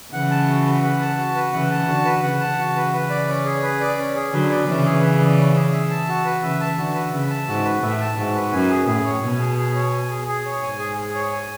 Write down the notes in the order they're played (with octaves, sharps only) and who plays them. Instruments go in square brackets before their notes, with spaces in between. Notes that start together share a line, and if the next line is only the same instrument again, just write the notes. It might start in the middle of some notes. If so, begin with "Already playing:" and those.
[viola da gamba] C#3 E3 [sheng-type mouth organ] F#5
[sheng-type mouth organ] A5
F#4
B4
F#5
A5
F#4
B4
[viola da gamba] C#3 E3 [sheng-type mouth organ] F#5
[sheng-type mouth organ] A5
[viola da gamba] D3 [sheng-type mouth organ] F#4
[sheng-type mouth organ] B4
[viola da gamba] C#3 [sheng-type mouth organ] F#5
[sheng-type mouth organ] A5
[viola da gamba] C#3 E3 [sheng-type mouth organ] F#4
[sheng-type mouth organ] B4
B4
D5
C#4
G#4
B4
D5
C#4
G#4
[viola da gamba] D3 F#3 [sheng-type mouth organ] B4
[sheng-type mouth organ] D5
[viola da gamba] C#3 E3 [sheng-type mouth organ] C#4
[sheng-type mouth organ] G#4
B4
D5
C#4
G#4
E5
A5
F#4
B4
[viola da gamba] C#3 E3 [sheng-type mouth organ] E5
[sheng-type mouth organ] A5
[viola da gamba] D3 [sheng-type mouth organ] F#4
[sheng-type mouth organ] B4
[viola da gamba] C#3 [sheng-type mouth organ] E5
[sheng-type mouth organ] A5
[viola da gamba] G#2 [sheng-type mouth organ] F#4
[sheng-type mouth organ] B4
[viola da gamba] A2 [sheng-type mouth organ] E5
[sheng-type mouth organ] A5
[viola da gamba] G#2 [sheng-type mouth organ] F#4
[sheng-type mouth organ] B4
[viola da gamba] F#2 [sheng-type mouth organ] G#5
[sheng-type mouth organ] G#4
[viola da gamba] A2 [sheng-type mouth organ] G#4
[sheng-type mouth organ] C#5
[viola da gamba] B2 [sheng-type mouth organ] G#5
[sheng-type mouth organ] G#4
G#4
C#5
G#5
G#4
G#4
C#5
[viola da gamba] G#2 [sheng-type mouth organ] G#5
[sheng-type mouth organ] G#4
G#4
C#5
G#5